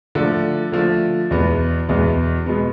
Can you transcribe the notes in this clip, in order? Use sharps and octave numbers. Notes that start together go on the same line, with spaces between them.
D3 F3 A3
D3 F3 A3
E2 B2 G#3 B3
E2 B2 G#3 B3
B2 G#3 B3